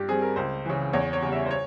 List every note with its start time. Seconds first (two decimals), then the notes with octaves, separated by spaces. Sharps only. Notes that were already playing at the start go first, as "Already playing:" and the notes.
Already playing: G2 G4
0.09 G3 C4 G#4
0.22 A#4
0.36 C#2 C5
0.65 C#3 E3
0.93 E2 C#5
1.13 C#5
1.22 C#3 G3
1.32 E5
1.46 C5
1.51 C#5